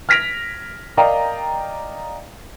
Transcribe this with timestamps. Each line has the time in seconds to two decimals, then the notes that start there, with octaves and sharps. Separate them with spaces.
0.09 F6 G#6 A#6 B6 D7 F7
0.97 A#4 D5 D#5 F5 G5 A#5